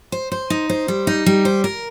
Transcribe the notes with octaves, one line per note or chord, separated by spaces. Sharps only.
C5
C5
D#4
C5
G3
D#4
G3
C5
A#4